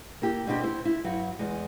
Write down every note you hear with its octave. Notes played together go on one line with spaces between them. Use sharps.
A#3 E4 G4
B2 G3 C4 D4 F4 G4
E4 C5
E4
G2 F#3
E2 G#3